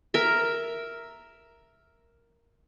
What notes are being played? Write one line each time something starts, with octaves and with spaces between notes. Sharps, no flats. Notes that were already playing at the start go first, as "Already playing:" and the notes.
A#4 E5